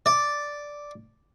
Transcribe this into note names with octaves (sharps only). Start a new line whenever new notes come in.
D5